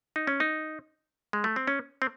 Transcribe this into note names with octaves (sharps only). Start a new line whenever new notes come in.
D#4
C#4
D#4
G#3
A3
C4
C#4
C4